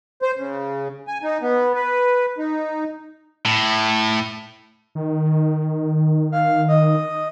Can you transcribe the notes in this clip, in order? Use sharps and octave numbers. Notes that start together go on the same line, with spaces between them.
C5
C#3
G#5
D#4
B3
B4
D#4
A2
D#3
F5
D#5